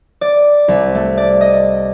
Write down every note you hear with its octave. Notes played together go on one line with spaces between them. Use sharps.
D5
C2
A3
D5
D#5